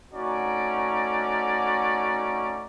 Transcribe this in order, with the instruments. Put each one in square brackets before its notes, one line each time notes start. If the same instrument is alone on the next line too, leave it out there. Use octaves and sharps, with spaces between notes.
[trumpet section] A3 C#4 D#4 F#4 D5 A#5